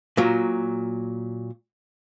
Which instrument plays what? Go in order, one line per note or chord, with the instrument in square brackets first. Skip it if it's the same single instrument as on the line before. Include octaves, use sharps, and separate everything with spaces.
[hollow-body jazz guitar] A#2 F#3